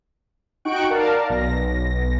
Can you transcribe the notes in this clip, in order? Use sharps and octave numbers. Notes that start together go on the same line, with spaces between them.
D#4 F#4 G5 C#6 F#6 D7
A#4 D5 F5 A5
B1 A#6